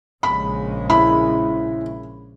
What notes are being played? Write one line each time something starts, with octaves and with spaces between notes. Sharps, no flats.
A#1 C#3 G#3 B5
E4 B5